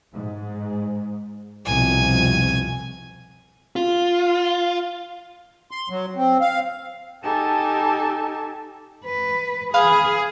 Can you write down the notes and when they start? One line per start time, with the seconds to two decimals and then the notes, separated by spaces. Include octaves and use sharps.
0.13 G#2
1.66 C2 F2 B2 G#5
3.76 F4
5.71 C6
5.90 F#3
6.16 C4
6.41 F5
7.23 D#4 G4 A4 G#5 A5
9.05 B4
9.74 G#4 B4 F5 B5